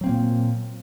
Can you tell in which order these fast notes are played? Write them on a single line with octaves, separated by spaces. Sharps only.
F#3 C4 A#3 A#2